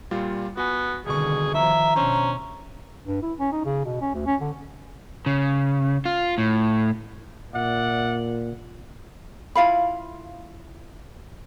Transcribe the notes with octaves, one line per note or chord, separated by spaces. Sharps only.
A#2 G3 F4
B3 F#4 G#5
C2 B2 D3 D#3 G#4 C#6
D#3 F3 E5 A#5
B2 C#4 D4 C5
G2
E4
C#4
D#4
C#3
B2
C#4
D2
C#4
D3
C#3
F4
A2
A#2 D5 E5 F#5
E4 F4 F5 B5